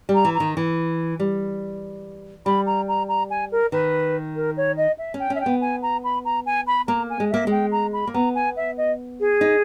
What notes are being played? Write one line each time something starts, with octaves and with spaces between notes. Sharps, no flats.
G3
A#5
E3
A#5
D#3
E3
G3
G3 B5
A#5
A#5
A#5
G#5
A#4
D#3 B4
A#4
C#5
D#5
E5
C#4
G5
C#4 E5
G5
B3
G#5
A#5
B5
A#5
G#5
B5
A#3 A#5
G#5
G#3
A#3 E5
G#3 G5
A#5
B5
A#3
B3 A#5
G#5
E5
D#5
G#4
D#4